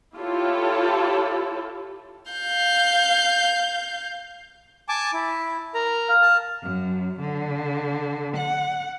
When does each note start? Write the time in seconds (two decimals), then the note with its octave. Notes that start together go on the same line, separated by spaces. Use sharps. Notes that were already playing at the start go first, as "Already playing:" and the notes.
0.17 E4 F4 G4 A4 C#5
2.31 F5 G6
4.89 G#5 A5 D6
5.13 E4
5.74 A#4 A#5
6.09 F5
6.21 A5
6.63 F#2
7.20 D3
8.37 F#5